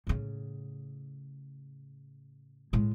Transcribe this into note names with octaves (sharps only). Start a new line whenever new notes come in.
A2 C#3
A2 G#3